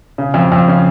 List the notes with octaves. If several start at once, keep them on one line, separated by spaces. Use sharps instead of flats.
C#3
F2
F2
C#3